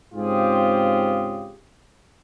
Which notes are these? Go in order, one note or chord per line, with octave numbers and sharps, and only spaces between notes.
G#2 C#3 C4 F4 G4 G#4